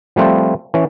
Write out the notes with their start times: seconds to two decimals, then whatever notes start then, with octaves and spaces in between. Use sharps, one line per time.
0.16 F3 G3 A3 C4 F4
0.74 E3 C#4